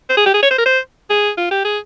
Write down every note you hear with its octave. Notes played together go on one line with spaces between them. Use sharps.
C5
G#4
G4
G#4
C#5
C5
A#4
C5
G#4
F4
G4
G#4